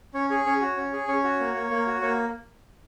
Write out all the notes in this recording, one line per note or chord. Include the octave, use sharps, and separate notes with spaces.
C#4 C#5
G#4 C#5
C#4 C#5
F#4
C#4
G#4
C#4 C#5
F#4
A#3
A#3
A#3
F#4
A#3 C#5